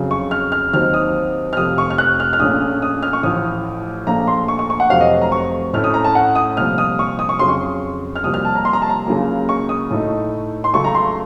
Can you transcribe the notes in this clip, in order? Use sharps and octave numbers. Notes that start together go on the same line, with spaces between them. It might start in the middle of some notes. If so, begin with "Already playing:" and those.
Already playing: F2 C#3 F#3
C#6
F6
F6
D#2 D#3 F#3 C4 D#4 F6
D#6
F6
F1 F2 C3 F3 D#6
C#6
F6
F#6
F6
F6
A#1 A#2 A3 C#4 D#6
D#6
F6
C#6
A1 A2 F3 D#6
A#1 A#2 F3 A3 A#5
C6
C#6
C#6
C#6
F#5
F1 F2 C3 F#3 C4 F5
D#5
A#5
C#6
A2 A3 C#4 F6
D#6
A#5
A5
F#5
D#6
C2 A#2 F3 F6
D#6
C#6
D#6
C#6
F2 C#3 F#3 C6
C#6
F6
C2 C3 F3 A#3 D#6
F6
A5
A#5
C6
A#5
A5
A#5
C#2 C#3 F#3 A#3
C#6
D#6
A2 A3 D#4
C6
C#2 C#3 F#3 A3 C#6
A#5
C6